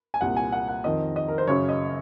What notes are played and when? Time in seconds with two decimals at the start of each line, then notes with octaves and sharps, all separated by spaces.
0.14 G#5
0.21 C2 A#2 F#5
0.37 G#5
0.52 F#5
0.68 F#5
0.84 F2 D#3 D#5
1.16 D#5
1.28 A#4
1.38 C5
1.47 F#2 C#3 C#5
1.69 D#5